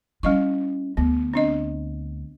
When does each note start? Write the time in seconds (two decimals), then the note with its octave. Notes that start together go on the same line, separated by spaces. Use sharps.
0.23 G3 C#4 E4 D#5 C#6
0.97 D2 B3
1.34 C4 D4 D#5